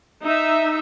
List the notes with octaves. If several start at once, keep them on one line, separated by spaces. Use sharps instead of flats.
D#4 E5